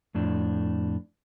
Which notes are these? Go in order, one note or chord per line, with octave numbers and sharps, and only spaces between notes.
F2 A2 D4